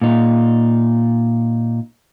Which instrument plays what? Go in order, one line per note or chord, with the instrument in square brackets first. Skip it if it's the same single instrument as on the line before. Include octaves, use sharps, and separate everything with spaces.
[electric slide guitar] A#2 D#4